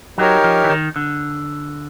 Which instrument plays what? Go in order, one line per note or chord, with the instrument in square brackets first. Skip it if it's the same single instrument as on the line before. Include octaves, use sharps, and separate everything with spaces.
[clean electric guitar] F#3 [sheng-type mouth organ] D#4 G4 A#4 C#5
[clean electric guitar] F3
E3
D#3
D3